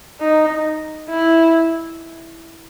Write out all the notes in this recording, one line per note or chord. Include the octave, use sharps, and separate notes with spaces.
D#4
E4